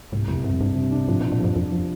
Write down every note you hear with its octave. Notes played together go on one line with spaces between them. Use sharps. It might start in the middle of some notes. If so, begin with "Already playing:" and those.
C2 G#2
C2 F2
G2 C3
F2
G2 D4
C3
D4
G#2 F3
A#2
D4
A#2
G2 F3
F2 F3
F3